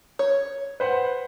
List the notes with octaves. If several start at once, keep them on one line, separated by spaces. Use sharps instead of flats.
C#5
B4 C5 F#5